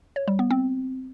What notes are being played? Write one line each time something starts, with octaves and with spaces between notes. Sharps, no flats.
C#5
G3
B3
C4